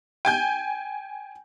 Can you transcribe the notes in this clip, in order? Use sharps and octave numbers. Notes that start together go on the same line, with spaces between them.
G5 G#5 G6